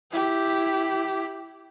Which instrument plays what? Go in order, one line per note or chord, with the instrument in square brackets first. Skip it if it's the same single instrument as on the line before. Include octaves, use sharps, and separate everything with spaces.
[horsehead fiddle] E4 G4